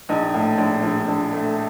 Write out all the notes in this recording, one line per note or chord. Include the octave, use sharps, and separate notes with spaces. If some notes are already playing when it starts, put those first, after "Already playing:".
A#1 D#4
A2
A#1
A#1
A#1
A3